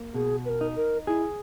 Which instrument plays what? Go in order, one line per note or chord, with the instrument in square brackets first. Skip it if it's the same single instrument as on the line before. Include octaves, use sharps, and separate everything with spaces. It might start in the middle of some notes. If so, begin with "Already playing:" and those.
Already playing: [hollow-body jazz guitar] A#3
[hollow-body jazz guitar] B2 [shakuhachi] G#4
[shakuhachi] B4
A#4
[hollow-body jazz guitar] D#4
[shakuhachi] A#4
[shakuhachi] E4 [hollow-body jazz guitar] G#4